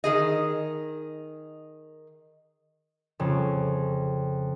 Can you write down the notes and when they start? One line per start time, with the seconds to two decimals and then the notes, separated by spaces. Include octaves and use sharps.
0.04 D#3 G#4 D#5
3.20 F2 C#3